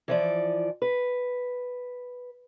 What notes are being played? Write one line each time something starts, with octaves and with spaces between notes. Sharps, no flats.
E3 F3 D5
B4